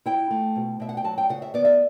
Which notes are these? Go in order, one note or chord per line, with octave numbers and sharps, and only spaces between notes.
E4 G5
A3
B2
B2 E5
F#5
G5
F#3 A5
G5
C#3 F#5
E5
B3 D5
E5